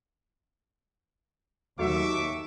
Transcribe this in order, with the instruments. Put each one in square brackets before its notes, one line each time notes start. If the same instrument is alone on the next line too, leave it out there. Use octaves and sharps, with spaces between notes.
[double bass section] D#2 D#3 [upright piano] F#3 A3 F#4 [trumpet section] E5 C#6 D6